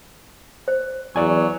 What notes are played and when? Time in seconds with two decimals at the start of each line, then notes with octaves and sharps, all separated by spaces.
0.68 C5
1.16 E2 F#3 D5 G#5